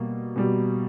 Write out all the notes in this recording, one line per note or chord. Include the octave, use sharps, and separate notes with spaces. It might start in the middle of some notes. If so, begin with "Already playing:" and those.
Already playing: B2 G3 A#3
B2 G3